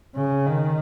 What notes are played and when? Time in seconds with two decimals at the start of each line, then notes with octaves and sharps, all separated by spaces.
0.15 C#3
0.46 D#3